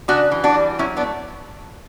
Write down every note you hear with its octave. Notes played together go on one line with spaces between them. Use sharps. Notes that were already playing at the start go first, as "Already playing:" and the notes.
C#3 D4 F#4
E3
D4 F#4
G3
F#3 C#4 E4
B3 D4
A3